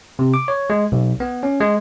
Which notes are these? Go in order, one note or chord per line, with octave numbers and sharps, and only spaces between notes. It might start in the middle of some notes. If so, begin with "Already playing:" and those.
C3
D6
C#5
G#3
B1
B3
C#4
G#3